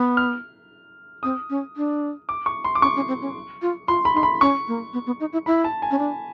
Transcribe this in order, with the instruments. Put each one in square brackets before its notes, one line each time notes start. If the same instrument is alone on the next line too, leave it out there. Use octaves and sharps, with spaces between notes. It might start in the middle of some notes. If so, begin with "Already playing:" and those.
Already playing: [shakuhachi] B3
[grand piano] F6
[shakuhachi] C4 [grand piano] D#6
[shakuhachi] C#4
D4
[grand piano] D6
C#6
C6
D6
[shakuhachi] C#4 [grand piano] C#6
[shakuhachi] C#4
C4
C#4
F4
[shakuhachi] F4 [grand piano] C6
[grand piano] B5
[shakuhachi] D#4
[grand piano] C6
B5
[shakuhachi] C#4 [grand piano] C#6
[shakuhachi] A#3
B3
B3
D#4
E4
[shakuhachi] E4 [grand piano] B5
[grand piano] A5
G#5
[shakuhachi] C#4
D4